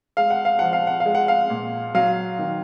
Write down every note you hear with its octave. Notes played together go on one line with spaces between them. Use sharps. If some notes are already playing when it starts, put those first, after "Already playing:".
G#3 F5
F#5
F5
F3 F#5
F5
F#5
F5
G#3
F#5
F5
A#2
F#3 F5
D#3